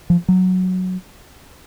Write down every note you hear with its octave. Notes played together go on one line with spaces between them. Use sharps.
F3
F#3